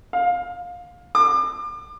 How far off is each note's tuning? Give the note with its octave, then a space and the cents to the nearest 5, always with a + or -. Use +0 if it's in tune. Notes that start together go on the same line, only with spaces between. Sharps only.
F5 +20
D6 +35